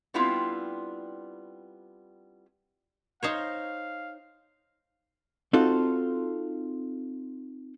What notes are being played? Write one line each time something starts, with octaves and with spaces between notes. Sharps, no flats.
G3 B3 C4 D4 E4 F4
D#4 C5 C#5 F5
C4 D#4 F4 F#4 A4